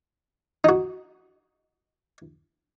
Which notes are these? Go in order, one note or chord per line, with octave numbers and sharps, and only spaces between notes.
D#4 F#4